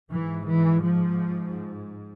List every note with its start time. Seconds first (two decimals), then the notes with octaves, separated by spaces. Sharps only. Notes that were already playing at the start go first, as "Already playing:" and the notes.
0.12 G#2 E3
0.47 E3
0.82 F3